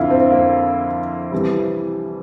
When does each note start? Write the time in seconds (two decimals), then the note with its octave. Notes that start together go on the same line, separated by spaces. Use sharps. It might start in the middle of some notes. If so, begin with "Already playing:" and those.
Already playing: F2 D3 F3 E4 F4
0.10 C4
0.31 A#3
1.32 C2 C3 E3 G3